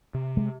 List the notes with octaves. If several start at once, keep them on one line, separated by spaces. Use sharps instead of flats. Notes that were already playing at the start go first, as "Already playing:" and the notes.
C3
G#3